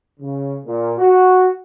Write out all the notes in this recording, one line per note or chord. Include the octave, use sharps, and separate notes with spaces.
C#3
A#2
F#4